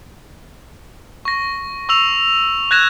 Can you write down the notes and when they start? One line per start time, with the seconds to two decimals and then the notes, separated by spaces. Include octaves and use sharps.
1.25 C#6 A#6
1.89 C#6 E6 F7
2.71 F#6 G#6 A#6 E7